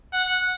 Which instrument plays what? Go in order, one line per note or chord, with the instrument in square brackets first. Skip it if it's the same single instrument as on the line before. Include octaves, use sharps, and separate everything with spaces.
[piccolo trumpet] F#5